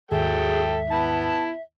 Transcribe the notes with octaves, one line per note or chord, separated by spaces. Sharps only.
D#2 G#2 D#3 F#3 G#4 A4 E5 G5
B3 E4 A5